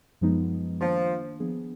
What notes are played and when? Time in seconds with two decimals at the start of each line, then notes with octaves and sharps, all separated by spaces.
0.21 F#2 F3 G#3 B3 D#4
0.81 D#3 F3 A#3 D4
1.40 F3 B3 D4 G#4